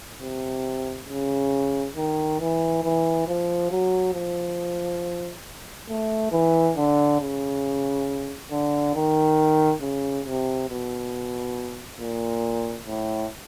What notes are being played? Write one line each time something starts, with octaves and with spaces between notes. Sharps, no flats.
C3
C#3
D#3
E3
E3
F3
F#3
F3
A3
E3
D3
C#3
D3
D#3
C#3
C3
B2
A#2
A2